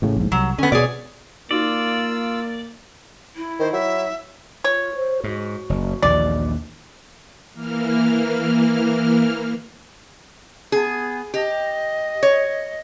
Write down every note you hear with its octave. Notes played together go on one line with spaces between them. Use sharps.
A1 A2 C#3
A#1 G#2
C2 F#3
D3 B3 C#4
B2 B3 G#4 C#5 D5
A#3 D#4 F4 F#4 D5 E6
E4
D#3 C5
F#3 E5
F4 C#5
C5
G#2 F#4
F#1
A#1 D#2 E3 D5
E3 A#3 F6
B3 G#4
G4 D#5
C#5